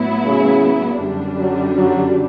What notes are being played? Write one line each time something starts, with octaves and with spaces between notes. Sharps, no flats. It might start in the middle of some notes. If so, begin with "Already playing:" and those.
Already playing: A2 F#3 B3 E4
C#3
F#2 D3 G3 D4
F#3
F#3